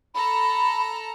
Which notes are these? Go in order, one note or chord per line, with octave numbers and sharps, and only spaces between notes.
A4 A#5 B5